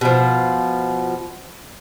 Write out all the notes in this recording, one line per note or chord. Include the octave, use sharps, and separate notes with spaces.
B2 F3